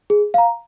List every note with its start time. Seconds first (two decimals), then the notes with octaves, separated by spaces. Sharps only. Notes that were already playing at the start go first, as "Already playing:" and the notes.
0.10 G#4
0.34 F5 A#5